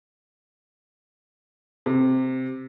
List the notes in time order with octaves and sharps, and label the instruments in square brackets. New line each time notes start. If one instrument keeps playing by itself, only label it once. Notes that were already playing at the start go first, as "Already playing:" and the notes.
[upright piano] C3